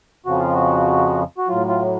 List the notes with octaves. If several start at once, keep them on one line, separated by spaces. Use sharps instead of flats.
F2 C#3 F3 F#4
F4
F#4
F#4
A2 F#3 F4
F4